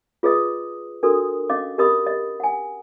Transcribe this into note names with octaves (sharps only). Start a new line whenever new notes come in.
F4 G#4 B4 D#5 D#6
D4 F#4 A4 A#4 D#6
C#4 D#5 F5 D6
G4 A#4 D#5 B5 D#6
D#5
F#5 G#5